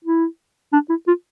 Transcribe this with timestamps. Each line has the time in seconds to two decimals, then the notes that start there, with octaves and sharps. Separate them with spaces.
0.04 E4
0.73 D4
0.89 E4
1.07 F4